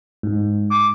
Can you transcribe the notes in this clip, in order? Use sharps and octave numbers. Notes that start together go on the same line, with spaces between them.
G#2
D6